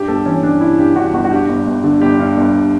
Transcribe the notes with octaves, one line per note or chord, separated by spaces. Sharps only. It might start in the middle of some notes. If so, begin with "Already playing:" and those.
Already playing: G2 G4
G1 A4
E3 C#4
G1 D4
G2 E4
G2 G4
G2 F#4
G1 F#4
F#4
G2 G4
G1
G1
D3
G1 G4
G2
G1